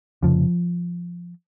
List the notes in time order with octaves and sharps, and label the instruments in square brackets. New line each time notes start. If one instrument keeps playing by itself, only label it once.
[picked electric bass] F1 F2 C#3 F3